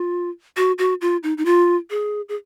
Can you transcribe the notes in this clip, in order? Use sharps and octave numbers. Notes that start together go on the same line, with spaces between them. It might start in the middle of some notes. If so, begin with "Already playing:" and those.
Already playing: F4
F#4
F#4
F4
D#4
D#4
F4
G#4
G#4